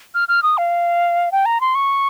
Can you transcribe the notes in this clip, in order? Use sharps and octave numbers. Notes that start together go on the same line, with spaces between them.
F6
F6
D#6
F5
G5
A#5
C6
C#6